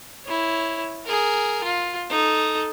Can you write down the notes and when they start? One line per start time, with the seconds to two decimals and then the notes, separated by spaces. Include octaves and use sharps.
0.25 E4 C#5
1.06 G#4 A#4
1.64 F4
2.10 D#4 A4